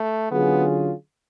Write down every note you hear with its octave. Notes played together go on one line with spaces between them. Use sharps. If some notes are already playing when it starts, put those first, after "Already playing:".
Already playing: A3
D3 F#3 B3 C#4 F4 G#4